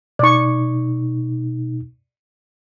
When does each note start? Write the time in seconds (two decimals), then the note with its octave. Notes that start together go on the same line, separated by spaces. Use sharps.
0.19 B2 D#4 D5 C#6